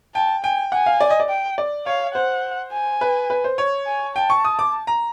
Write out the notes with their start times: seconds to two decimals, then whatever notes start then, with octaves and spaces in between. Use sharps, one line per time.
0.15 G5 A5
0.44 G5 G#5
0.72 F#5 G#5
0.86 F5
1.01 D5
1.10 D#5
1.20 D5
1.29 G5
1.58 D5
1.86 C#5 F5
2.15 C5 F#5
2.72 G#5
3.01 B4
3.30 B4
3.44 C5
3.58 C#5
3.87 G#5
4.15 G5 A5
4.30 C#6
4.45 D#6
4.59 D6
4.87 A#5